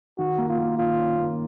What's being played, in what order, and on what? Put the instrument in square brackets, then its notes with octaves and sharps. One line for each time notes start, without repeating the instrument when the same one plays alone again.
[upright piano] D#3 [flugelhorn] F#4
[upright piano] A#3
[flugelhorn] F4
[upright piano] A#3
[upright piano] D#3 [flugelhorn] F4
[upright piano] C#4
A#3